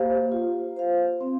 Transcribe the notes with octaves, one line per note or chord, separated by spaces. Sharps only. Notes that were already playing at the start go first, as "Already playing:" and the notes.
Already playing: A#3 G4 C5 F5
F4
C5 F5
C4